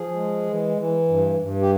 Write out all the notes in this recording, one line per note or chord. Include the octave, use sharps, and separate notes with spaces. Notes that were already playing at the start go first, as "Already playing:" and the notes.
Already playing: F3 G#4
G#3
E3
E3
G2
G2
G4